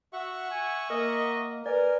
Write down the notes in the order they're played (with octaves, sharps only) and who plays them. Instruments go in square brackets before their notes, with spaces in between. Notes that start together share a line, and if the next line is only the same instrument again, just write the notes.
[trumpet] F#4 [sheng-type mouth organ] E5 F#5 C#6
[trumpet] G#5
[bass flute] A#3 [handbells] A#4 [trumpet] D#5
[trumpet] A#4 [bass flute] B4 [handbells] D5 [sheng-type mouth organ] G#5